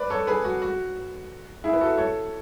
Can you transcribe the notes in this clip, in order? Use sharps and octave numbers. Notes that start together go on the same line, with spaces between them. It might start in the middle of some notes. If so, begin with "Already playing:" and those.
Already playing: B4 D5
A4 C#5
G#4 B4
F#4
F#4
E4 G#4
B4
F#4 A4
A4 C#5